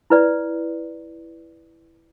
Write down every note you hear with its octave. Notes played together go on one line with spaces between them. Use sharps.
E4 B4 D5